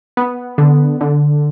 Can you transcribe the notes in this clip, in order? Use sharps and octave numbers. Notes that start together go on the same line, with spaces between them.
B3
D3
D3